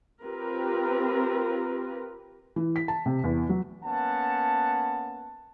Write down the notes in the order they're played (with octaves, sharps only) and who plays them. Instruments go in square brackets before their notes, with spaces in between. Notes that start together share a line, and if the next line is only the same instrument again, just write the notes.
[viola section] C4 F4 G4 A#4 B4
[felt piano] E3
B6
A5
C3
E2
F#3
[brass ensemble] A#3 B3 C#4 F#5 A5